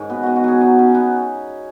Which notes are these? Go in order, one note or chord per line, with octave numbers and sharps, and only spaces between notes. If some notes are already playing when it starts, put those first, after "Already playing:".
Already playing: G#2 D#3 C#4
B2 B3
B2 F#4
F#4
F#3 G#4
F#3 D#4
F#3 C#4
F#3 B3